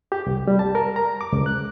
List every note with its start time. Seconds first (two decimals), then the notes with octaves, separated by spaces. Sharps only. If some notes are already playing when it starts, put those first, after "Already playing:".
0.12 G4
0.26 C2
0.48 G3
0.59 A5
0.75 A#4
0.96 A#5
1.21 D6
1.33 C#2
1.46 F#6